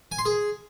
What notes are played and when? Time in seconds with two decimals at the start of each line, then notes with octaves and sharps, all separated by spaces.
0.12 G#5
0.19 C6
0.26 G#4